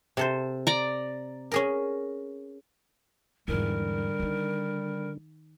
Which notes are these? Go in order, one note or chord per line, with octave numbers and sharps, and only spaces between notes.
C3 A4 C5
D5 A#5
C#4 G#4 A#4
E2 G#2 D3 G3 A#4
D#3 D#4